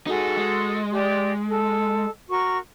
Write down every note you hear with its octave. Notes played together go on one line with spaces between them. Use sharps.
D#4 F#4 G#4 A4
G#3
G4 D5
A4
F#4 A#4 C#6